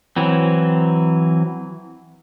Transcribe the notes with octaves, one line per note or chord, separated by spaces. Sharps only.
E3 F#3 C4